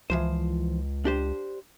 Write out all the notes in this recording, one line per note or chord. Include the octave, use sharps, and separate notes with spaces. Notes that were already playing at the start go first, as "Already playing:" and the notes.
C#2 E3 F3 C5
D4 G4 C5